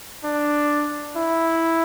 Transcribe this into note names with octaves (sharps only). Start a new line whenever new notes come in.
D4
E4